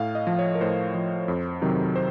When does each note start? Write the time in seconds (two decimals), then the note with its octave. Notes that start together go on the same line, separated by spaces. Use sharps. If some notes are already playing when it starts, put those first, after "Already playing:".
Already playing: A2 F5
0.15 D#5
0.27 F3
0.39 C#5
0.55 A#4
0.61 A2 C5
0.94 F3
1.28 F2
1.62 C3 D#3 F#3
1.96 C5